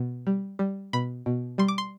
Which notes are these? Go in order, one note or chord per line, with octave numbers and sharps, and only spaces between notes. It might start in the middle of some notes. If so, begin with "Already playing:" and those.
Already playing: B2
G3
G3
B2 B5
B2
G3 C6
D6
C6